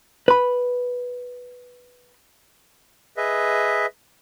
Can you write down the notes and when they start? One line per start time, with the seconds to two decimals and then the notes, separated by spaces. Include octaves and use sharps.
0.28 B4 B5
3.17 G#4 B4 D#5 E5